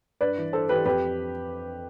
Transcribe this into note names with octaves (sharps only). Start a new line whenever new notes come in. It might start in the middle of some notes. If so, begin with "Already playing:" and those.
G2 B4 D5
E3
G2 A4 C5
E3 G4 B4
F2 G4 B4